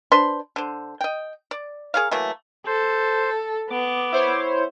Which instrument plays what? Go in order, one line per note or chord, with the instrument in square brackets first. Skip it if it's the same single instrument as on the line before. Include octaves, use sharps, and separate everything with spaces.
[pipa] D4 B4 C5 C6
D3 C5
D#5 G5
D5
G#4 A#4 C#5 F5
E3 F#3 A3 A#3
[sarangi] A4 [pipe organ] C5
[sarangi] B3 [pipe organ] D6
[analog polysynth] E4 C5 C#5